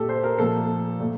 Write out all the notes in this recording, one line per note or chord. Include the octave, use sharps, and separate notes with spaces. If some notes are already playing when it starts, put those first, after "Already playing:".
Already playing: A#2 A3 G4 A4
C5
A#4
A#2 F3 A3 A4
A#2 A3